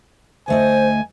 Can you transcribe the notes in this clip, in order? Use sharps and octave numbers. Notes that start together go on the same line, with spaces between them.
D2 A3 C5 D#5 G#5